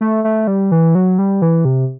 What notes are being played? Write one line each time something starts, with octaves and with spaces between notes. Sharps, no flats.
A3
A3
G3
E3
F#3
G3
E3
C3